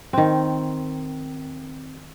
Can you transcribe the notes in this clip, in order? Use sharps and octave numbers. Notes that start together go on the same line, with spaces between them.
D#3 C4